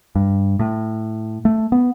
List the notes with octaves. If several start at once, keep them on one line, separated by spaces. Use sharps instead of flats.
G2
A2
A3
B3